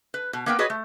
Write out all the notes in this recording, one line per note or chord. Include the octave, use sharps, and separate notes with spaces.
B4
B2
A#3 B3 A#4 B4 F5 G5
F#4 G#4 B4 C#5 D#5
A3